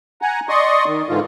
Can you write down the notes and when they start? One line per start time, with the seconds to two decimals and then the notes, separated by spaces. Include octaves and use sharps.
0.22 F#5 G#5 A#5
0.49 D5 D#5 C6 C#6 D#6
0.87 D#3
1.09 G#2 D3 E3 F4